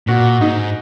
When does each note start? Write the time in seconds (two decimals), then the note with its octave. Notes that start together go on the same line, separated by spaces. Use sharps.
0.08 A#2 F#4
0.41 G#2 D#4